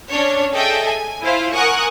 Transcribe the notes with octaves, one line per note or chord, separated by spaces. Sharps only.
C#4 D4 C#5
G#4 A4 D#5 E5 G5
G#5
E4 F4 C5
A#4 F#5 G#5 C#6 D#6 F#6